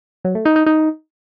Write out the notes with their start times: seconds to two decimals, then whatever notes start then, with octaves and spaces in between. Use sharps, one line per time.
0.25 F#3
0.35 A3
0.45 D#4
0.56 D#4
0.66 D#4